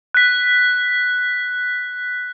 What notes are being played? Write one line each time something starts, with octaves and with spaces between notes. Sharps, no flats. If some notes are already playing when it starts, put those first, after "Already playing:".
F#6 B6